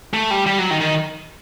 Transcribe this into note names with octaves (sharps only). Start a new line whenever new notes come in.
A3
G3
G3
F#3
D#3
D#3